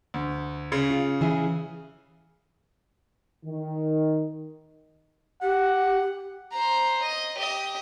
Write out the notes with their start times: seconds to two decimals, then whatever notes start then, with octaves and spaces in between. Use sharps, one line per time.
0.14 D2
0.72 C#3
0.90 F4
1.21 E3 G#4 E5
3.45 D#3
5.42 G4 F#5
6.52 C5 A#5
7.03 D#5
7.38 G4 D#5